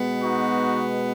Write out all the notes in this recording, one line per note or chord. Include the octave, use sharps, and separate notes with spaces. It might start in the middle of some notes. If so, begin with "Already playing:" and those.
Already playing: B2 G#3 B3
D#4 F#4